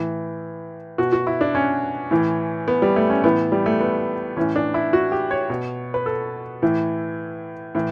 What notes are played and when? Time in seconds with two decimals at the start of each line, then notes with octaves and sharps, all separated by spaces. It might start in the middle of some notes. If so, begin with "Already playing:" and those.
Already playing: A2 E3
0.98 B2 F#4
1.12 F#4
1.27 E4
1.41 D4
1.55 C#4
2.11 A2 E3
2.68 B3
2.82 G3
2.96 A3
3.10 C#4
3.24 A2 E3 B3
3.52 G3
3.66 A3
3.80 B3
4.37 A2 E3 C#4
4.56 D4
4.74 E4
4.93 F#4
5.12 G4
5.31 C#5
5.50 B2
5.94 B4
6.06 A4
6.62 A2 E3
7.75 A2 E3